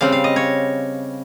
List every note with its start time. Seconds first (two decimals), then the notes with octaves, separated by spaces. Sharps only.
0.01 C#3 G3 C4 F5
0.12 F5
0.24 D#5
0.36 C#5